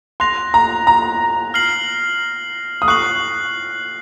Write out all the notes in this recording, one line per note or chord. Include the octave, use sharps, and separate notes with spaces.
C6 F#6 A#6 F7
A#5
A#5
F6 C7 F#7
D#6
C#6 F#6 C7 F#7